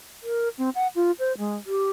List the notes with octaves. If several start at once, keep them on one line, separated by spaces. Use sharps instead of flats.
A#4
C4
F#5
F4
C5
G#3
G4